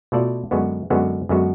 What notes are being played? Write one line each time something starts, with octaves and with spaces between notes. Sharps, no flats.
B2 A3 F4 A4 D5
F#2 D3 G#3 B3 F#4
F#2 D3 G#3 B3 F#4
F#2 D3 G#3 B3 F#4